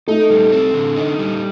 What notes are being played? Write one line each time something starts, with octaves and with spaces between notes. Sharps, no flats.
A3 D#4
G3
C4
D3
D#4
G3